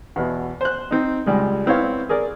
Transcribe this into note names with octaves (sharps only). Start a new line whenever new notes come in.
E2 B2
C5 F#6
C4 D#4
C#2 G3 G#3
B3 C4 E4 C#5 F5
G#4 A#4 D5